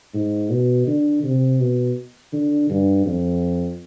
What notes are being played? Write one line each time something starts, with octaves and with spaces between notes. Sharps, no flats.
G#2
B2
D3
C3
B2
D3
G2
F2